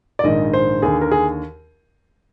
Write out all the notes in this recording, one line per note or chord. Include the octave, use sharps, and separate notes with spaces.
D5
A#1 G#2 D#3 D#5
C5
D#2 D3 G#4
A#4
G#4